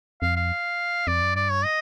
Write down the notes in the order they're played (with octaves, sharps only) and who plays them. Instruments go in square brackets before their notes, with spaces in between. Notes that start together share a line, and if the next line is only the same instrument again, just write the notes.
[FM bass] F2 [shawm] F5
[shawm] F5
[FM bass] F2 [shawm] D5
[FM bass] F#2
[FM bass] G2 [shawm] D5
[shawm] C#5
D#5